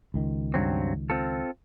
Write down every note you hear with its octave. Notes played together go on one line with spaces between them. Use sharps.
C#2 D#3
G2 F#3 C4
C4 F4 A4